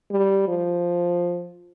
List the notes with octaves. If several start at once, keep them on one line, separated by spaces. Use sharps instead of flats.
G3
F3